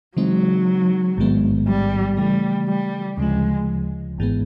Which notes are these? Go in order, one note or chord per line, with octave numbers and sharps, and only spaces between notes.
C#3 E3 F#3 G#3 C4 D#4
A1 G#2 D#3 G#3 B3
G3
C#3 E3 G3 A3
G3
D2 C#3 F3 G#3
G#1 G#2 E3 G#3 B3